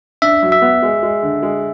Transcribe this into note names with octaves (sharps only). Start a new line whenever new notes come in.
D4 E5
F#3
E5
B3
G#3
G#3
D3
G#3